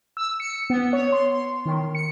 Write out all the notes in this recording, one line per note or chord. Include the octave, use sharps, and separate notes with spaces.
E6
C#7
B3
C#5
C6
C6
D#3
C#7